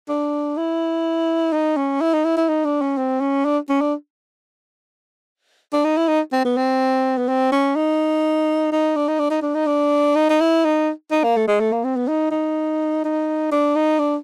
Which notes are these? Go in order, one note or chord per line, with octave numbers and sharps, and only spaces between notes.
D4
E4
D#4
C#4
E4
D#4
E4
E4
D#4
D4
C#4
C4
C#4
D4
C#4
D4
D4
D#4
E4
D#4
C4
B3
C4
B3
C4
C#4
D#4
D#4
D4
D#4
D4
D#4
D4
D#4
D4
D#4
D#4
E4
D#4
D#4
A#3
A3
G#3
A3
A#3
C4
B3
D#4
D#4
D#4
D4
D#4
D4